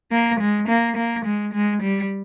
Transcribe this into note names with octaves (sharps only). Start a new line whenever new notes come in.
A#3
G#3
A#3
A#3
G#3
G#3
G3